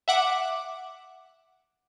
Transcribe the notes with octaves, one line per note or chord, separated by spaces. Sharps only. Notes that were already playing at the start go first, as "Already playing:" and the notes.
E5 F#5 D6